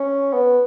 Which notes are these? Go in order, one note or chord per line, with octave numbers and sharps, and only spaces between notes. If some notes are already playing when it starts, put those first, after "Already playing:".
Already playing: C#4
B3